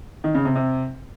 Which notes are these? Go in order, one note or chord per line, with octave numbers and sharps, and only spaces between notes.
D#3
C#3
C3
C3